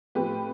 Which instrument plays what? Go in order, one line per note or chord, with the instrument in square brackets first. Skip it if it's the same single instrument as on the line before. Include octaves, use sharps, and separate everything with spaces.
[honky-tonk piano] A2 F3 C4 G4 B4